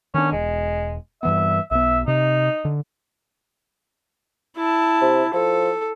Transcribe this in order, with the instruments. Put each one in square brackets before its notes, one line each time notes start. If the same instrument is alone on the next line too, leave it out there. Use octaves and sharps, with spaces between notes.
[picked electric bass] D#3 B3 D4 [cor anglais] C#4
[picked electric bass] E1 [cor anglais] G#3
[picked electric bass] G2 E3 B3 [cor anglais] E5
[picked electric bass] B1 B3 [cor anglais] E5
[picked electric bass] C3 [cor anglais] D#4
[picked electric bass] D3
[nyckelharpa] E4 A5
[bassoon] C3
[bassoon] F3 [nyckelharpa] A4